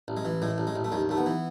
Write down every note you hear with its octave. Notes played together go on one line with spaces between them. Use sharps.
A1
G#3
E3
A2 G#3
A1
G#3
A1
A3
D#2 G#3
D#2 A3
B3
E3